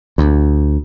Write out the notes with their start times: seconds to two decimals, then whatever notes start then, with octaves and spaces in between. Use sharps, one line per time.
0.18 D2